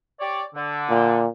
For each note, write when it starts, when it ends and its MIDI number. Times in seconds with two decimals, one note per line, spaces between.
0.20 0.42 67
0.20 0.42 73
0.20 0.42 74
0.55 1.21 50
0.89 1.28 46